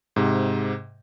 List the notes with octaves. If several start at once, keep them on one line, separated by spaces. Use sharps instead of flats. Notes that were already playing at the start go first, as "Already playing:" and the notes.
G#2 C3